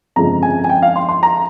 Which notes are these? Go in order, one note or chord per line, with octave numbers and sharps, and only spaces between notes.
G1 F2 C#3 F3 G#3 A#5
G#5
G#5
G5
F5
C6
C6
A#5